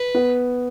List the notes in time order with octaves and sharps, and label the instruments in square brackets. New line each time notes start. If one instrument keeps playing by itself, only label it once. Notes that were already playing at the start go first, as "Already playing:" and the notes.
Already playing: [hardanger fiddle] B4
[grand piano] B3